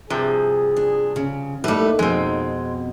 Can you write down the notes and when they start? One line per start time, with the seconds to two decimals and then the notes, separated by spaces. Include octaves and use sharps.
0.10 G2 C3 F3 G#4
0.76 D4
1.16 C#3
1.64 A2 G3 A3 A#3 D#4 B4
1.99 F2 B2 G#3 C4